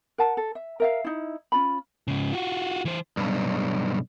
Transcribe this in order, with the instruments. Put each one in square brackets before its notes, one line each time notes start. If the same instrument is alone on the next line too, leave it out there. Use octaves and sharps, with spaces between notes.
[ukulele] A#4 F#5 A5
A4
E5
A#4 E5 F5
D#4 E4
C#4 F4 B5
[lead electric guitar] G#2 C#3
F4 F#4
E3 C5
[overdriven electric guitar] B1 G2